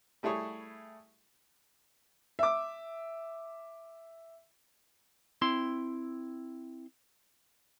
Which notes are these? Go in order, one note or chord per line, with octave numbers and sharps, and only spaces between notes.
G3 A3 E4 G#4 C#5
E5 D6
C4 E4 C6